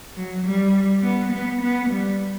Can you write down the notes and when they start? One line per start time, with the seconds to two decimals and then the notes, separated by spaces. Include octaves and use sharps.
0.15 F#3
0.44 G3
1.03 B3
1.32 B3
1.61 B3
1.90 G3